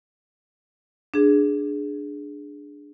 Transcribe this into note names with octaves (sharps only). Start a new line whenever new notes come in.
D4 G#4